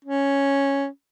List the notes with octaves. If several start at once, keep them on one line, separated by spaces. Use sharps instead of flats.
C#4